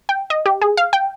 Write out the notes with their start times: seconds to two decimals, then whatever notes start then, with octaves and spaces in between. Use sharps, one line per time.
0.09 G5
0.30 D#5
0.46 G4
0.62 G#4
0.77 F5
0.93 G5